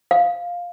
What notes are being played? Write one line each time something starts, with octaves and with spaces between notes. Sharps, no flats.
F5